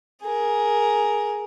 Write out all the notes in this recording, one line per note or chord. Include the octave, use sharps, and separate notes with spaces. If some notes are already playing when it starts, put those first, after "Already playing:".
G#4 A#4